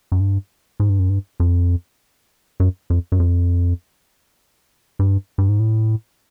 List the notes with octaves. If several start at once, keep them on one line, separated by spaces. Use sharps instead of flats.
F#2
G2
G#2
G2
F#2
G2
F2
F#2
F2
F#2
F2
G2
G2
G#2
A2